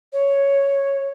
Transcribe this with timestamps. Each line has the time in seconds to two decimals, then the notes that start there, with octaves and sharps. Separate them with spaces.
0.12 C#5